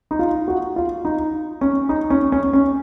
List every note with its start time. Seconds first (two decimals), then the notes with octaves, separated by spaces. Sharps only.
0.11 D#4
0.19 F4
0.48 F#4
0.76 F4
1.05 D#4
1.61 C#4
1.89 D#4
2.10 C#4
2.32 C#4
2.53 C#4